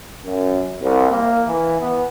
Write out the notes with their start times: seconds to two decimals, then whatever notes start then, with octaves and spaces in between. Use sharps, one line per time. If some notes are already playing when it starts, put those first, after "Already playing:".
0.25 F#2
0.81 C2
1.10 A#3
1.46 E3
1.80 B3